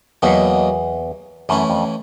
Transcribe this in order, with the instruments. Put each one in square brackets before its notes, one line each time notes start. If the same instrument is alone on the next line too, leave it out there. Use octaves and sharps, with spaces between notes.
[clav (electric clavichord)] E2 [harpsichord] B2 F#3 A#3 D#4
[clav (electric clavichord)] F#2 [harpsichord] E3 A3 C#4 E4
[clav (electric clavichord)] F2